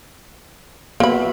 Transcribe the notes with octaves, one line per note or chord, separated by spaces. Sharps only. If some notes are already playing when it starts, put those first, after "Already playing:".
A#3 B3 F#4 E5 B5